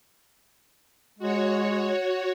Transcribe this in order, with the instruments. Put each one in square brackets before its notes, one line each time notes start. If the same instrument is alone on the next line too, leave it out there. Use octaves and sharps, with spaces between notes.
[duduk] G#3 [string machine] F#4 C#5